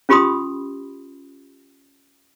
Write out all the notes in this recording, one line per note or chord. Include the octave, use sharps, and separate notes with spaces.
C#4 F4 G4 B5 C6 D#6